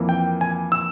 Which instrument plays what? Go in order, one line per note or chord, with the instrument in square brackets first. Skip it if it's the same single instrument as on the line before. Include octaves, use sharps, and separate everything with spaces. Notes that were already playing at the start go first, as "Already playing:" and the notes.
Already playing: [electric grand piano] F2 E3 A#3
G5
G#5
E6